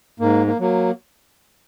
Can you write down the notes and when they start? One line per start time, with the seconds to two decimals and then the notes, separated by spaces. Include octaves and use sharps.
0.20 G#2 A#3
0.47 A#3
0.59 F#3 A#3